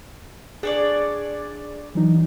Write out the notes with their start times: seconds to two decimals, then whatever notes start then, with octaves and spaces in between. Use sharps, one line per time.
0.63 D4 G#4 C#5 D5
1.95 E3 F#3 D#4